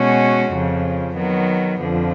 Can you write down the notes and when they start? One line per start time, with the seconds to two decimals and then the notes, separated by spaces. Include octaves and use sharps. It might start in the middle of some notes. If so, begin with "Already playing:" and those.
Already playing: B2 G#3 C#4 F#4
0.51 F2 C#3 F3
1.15 D#3 F#3 B3
1.80 F2 D3 F3